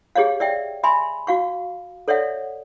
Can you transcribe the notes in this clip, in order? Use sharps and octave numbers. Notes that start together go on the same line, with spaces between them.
G4 G#4 C#5 D#5 F5
D5 E5 G5
E5 G#5 B5 C6
F#4 F5 C#6
A4 C#5 D5 E5 F#5